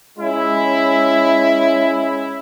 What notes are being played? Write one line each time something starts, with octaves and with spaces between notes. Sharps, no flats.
G#3 C#4 E4